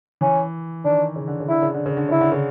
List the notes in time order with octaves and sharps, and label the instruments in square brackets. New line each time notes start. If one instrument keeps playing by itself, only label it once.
[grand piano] E3 [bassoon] C#4
[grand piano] D#3 [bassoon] D4
[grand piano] C#3
D3
C#3
[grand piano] D3 [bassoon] E4
[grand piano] C#3
D3
C#3
D3
[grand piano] C#3 [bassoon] E4
[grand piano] D3
C#3